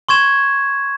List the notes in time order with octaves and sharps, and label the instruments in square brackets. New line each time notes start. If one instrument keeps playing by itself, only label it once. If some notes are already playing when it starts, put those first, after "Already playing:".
[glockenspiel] C6 C#6 G#6 E7